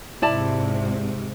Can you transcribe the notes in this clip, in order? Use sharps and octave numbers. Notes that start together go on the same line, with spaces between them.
G#2 C3 E4 D5 A5